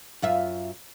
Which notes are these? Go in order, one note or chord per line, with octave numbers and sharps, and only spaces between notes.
F#2 F4 E5